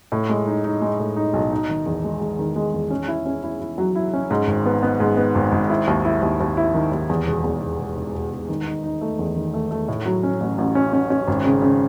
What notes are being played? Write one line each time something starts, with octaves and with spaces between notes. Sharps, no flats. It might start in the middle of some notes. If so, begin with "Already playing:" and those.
A2
G#3
D#4
D#4
G#3
A2
D#4
B1
D#4
D#3
E2
G#3
G#3
D#3
G#3
E2
C#4
E4
C#4
E4
E4
F#3
E4
C#4
G#2
G#1
B3
B3
G#2
B3
G#1
G#1
E4
D#2
E4
D#2
D#2
E4
D#3
D#2
E2
E1
E2
E1
E1
E1
E1
E1
D#3
D#4
D#4
A3
E2
D#3
A3
A3
A2
F#3
C#4
A1
A1
C#4
C#4
C#4
G#1
C#3
C#3